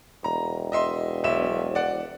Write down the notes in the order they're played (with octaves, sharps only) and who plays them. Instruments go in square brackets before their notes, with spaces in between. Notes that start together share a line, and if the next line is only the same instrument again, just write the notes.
[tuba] E1 [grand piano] A#5
[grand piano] D#5 E5 C6
B1 E5 E7
D5 F#5